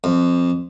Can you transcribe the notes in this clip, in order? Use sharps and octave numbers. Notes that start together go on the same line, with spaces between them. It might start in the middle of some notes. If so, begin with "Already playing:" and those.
F2